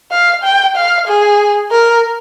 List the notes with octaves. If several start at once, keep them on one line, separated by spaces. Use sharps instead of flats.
F5
G5
F5
G#4
A#4